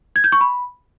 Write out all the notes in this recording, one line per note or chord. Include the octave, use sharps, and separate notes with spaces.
G#6
G6
C#6
B5